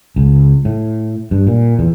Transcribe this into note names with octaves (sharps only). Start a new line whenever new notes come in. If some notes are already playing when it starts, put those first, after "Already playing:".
C#2
A2
G2
A#2
E2